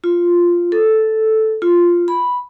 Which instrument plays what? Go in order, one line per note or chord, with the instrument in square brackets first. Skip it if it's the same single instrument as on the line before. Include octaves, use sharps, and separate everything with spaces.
[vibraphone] F4
A4
F4
B5